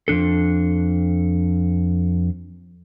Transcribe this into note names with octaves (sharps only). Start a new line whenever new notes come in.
F2 C#3 D4 A4